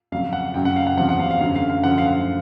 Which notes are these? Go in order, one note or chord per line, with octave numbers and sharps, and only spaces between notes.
F2 C#3 F#3 F5
F#5
F#2 C#3 F#3 G5
F#5
F5
F#5
E2 C3 F3 F#5
F#5
F5
F5
F#2 D3 F#3 F5
F5
F5
F#2 D3 F3 F#5
F5
F5